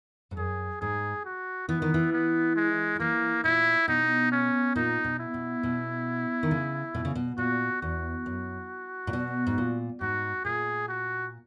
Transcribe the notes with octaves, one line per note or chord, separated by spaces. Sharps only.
G#2
F#2 G#4
G#2 G#4
F#4
E3 B3
D#3
E3
B3
G#3
F#3
E3 A#3
A#2 E4
B2 D#4
C#4
A#2 D#4
B2
E4
B2
B2
D#3
C#3
B2
C#3
B2
A#2 F#4
E2 F#4
F#2
A#2
B2
G#2
A#2
G#2 F#4
A#2 G#4
F#4